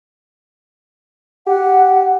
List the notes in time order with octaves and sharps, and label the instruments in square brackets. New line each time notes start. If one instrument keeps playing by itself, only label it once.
[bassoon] G4 [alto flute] F#5